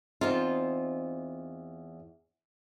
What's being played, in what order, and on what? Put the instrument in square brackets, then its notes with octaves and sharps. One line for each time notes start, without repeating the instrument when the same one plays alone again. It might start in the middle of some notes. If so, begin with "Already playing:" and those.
[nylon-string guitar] E2 C4 D#4 F4